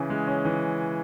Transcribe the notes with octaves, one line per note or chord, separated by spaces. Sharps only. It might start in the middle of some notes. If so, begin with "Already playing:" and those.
Already playing: C#3 E3 C#4
G#3
C#4
E3